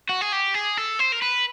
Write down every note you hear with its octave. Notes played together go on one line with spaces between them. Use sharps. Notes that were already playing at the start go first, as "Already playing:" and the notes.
F#4
G#4
G4
G#4
A4
C5
A#4
B4